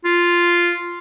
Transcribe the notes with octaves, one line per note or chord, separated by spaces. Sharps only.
F4